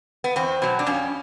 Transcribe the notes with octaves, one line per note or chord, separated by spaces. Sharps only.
B3
E2 C4
B2 F#3
D4
F2 C#4